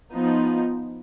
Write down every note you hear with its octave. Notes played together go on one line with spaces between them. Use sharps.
F3 B3 D#4